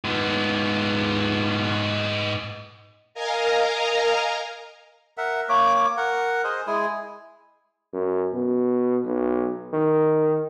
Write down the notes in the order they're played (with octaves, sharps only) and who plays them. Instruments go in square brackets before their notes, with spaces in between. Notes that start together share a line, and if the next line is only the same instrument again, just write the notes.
[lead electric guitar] G#2 B3
[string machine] A#4 D#5 F5 G#5 A#5
[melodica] A#4 E5 F#5
A#3 C#5 D6
A#4 F#5
G#4 C5 D#5
G#3 E4 G#4 G#5
[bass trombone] F#2
B2
B1
D#3